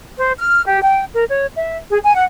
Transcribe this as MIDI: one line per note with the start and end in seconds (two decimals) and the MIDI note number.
0.18 0.31 72
0.38 0.63 89
0.67 0.80 67
0.82 1.03 79
1.13 1.24 70
1.28 1.46 73
1.56 1.77 76
1.90 1.99 68
2.03 2.13 80
2.15 2.25 78